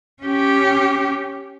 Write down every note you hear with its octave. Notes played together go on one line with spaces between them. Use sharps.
C#4 G4